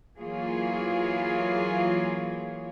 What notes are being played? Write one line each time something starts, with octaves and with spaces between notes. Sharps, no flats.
E3 F#3 A#3 F4 G#4 C#5